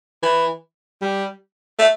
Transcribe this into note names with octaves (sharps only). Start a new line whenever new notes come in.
E3
G3
A3